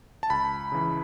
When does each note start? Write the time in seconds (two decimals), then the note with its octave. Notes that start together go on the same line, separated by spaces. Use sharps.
0.23 A5
0.30 C#2 B5
0.72 C#3 E3